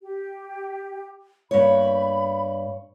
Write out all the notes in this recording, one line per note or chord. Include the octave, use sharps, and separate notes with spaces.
G4
G2 A#3 B3 C#5 B5